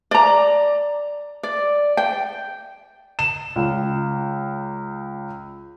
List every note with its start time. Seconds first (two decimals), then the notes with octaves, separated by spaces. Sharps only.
0.11 D5 A#5
1.43 D5
1.97 G5
3.19 E7
3.56 C#2